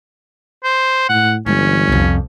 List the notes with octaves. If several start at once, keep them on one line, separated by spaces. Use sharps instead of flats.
C5
A2 F#5
G1 E3 G#3 C#4
C2 F2